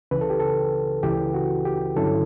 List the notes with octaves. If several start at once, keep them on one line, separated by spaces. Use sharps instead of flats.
C#2 C#3 E3 B4
A4
G4
A4
C#2 C#3 E3 G4
F#4
G4
G2 D3 F#3 C#4 E4 A4